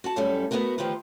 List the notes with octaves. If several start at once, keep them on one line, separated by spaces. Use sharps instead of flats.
F#4 F#5 A5
F#2 G3 A3 C#4 E4 A4
A3 B3 D#4 E4 F#4 A#4
D2 D#3 F3 E4 G4 B4